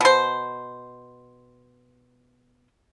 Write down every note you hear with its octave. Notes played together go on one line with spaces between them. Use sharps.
B2 C5